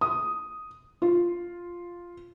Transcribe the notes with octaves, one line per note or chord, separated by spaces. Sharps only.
D#6
F4